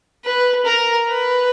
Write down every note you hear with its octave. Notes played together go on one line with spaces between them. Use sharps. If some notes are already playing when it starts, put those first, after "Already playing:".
B4
A#4
B4